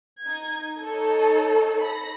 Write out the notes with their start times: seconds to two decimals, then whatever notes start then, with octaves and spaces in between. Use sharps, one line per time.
0.23 D#4 G#6
0.84 D#4 A4 C#5
1.83 B5 A#6